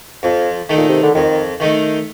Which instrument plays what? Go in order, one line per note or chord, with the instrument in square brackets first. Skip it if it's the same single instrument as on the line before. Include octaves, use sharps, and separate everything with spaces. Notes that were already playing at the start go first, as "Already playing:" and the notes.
[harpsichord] F2 [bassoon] F3
[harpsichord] D#3 A3 D#4
[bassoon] A#2
C3
D3
[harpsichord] F2 [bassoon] D#3
[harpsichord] D#3 A3 D#4